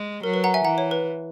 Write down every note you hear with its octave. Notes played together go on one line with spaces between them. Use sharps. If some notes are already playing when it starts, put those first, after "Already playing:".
Already playing: G#3
F#3 A#4
B4
F#5 A#5
E5 G#5
E3 F#5 A#5
C#5
B4